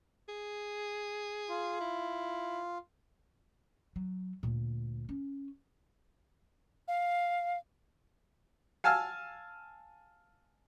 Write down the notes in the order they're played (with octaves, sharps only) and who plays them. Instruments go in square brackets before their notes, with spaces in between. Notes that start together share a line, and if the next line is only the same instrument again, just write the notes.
[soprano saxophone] G#4
[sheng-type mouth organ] F4
[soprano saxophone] E4
[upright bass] F#3
D2 A#2
C#4
[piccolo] F5
[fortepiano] F5 G#5 A5 E6 F6